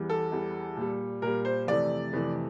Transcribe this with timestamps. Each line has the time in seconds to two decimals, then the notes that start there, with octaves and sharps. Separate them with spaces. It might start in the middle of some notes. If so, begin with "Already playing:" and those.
Already playing: E2 E3 G3
0.10 A4
0.32 E2 E3 G3
0.77 A#2 G3
1.22 A#2 G3 A#4
1.45 C5
1.67 F2 C3 E3 A3 D5
2.13 F2 C3 E3 A3